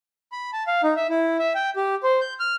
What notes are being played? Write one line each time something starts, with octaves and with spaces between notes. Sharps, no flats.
B5
A5
F5
D#4
E5
E4
E5
G5
G4
C5
G6
F6